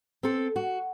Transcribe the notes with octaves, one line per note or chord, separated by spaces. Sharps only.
C4 A4
F#4